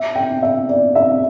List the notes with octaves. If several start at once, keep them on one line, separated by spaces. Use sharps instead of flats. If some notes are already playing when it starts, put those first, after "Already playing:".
Already playing: E5
G5
E5
D5
E5